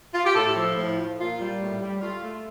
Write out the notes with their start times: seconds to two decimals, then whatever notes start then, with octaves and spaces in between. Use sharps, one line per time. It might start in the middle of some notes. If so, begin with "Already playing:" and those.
0.14 F4
0.25 G4
0.35 A2 A4
0.56 F3
0.76 A2
0.98 F3
1.18 A#2 F4
1.39 G3
1.60 A2
1.81 G3
2.01 A3 F4
2.23 A3